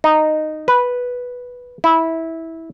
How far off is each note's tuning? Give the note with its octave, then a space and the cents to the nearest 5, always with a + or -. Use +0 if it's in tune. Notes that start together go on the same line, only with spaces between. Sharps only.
D#4 -10
B4 -5
E4 -15